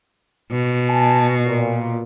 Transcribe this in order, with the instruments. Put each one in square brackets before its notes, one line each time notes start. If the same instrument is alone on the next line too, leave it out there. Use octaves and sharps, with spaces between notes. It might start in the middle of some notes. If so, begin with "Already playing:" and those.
[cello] B2
[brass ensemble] G#5 A5
A#2